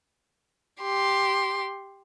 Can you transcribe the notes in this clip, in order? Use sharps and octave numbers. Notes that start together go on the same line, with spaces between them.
G4 C6